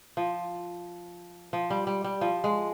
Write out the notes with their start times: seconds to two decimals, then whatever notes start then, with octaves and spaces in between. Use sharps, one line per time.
0.17 F3
1.53 F3
1.70 G3
1.87 G3
2.04 G3
2.21 F3
2.44 G#3